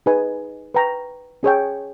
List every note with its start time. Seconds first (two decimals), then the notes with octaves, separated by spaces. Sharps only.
0.06 D#4 G#4 B4 D#5 G#5
0.74 B4 G5 A#5 C#6
1.43 C#4 G#4 C#5 G5